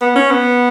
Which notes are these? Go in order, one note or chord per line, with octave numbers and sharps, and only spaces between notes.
B3
C#4
B3